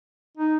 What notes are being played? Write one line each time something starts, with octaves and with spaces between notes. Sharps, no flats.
D#4